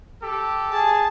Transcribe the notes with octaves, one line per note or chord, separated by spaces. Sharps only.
G4 A4
G#4 A5